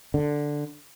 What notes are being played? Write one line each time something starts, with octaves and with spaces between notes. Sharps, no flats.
D3